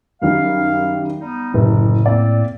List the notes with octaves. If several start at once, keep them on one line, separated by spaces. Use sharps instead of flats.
F#2 D#3 G3 F5
G3 B3 D#4
F#1 A2 C3
A#3 C4 D5